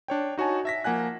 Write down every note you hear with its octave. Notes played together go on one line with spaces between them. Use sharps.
D4 C#5 G5
D#4 F#4 C#5 G#5 A5
E5 A#6 B6
F3 A#3 F#5 G#5 F#6